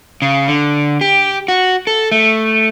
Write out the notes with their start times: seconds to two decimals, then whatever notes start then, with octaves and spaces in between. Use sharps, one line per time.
0.22 C#3
0.48 D3
1.01 G4
1.48 F#4
1.87 A4
2.12 A3